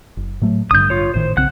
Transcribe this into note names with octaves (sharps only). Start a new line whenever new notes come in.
F#1
A2 F#3 A3
A1 G2 D3 D#6 G6
F4 C#5
G#1 A2 D#3 C5
B1 C#3 C4 F#5 F#6